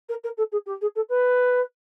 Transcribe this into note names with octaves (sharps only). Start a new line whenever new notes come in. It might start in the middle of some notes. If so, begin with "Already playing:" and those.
A#4
A#4
A4
G#4
G4
G#4
A4
B4